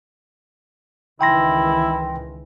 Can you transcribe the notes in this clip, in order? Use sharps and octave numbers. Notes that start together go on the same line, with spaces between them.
C#2 D#3 E3 E4 G5 C6 A#6